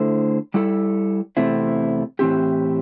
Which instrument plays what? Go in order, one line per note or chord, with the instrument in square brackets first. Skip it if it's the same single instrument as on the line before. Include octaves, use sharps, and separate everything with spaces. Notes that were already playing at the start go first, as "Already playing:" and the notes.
Already playing: [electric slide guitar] D3 A3 E4 A4 C5
G3 E4 A4
E2 C3 A3 C4 E4
A2 E3 C4 E4 G4